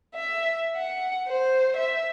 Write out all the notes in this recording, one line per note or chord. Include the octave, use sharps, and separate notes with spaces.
E5
F#5
C5
E5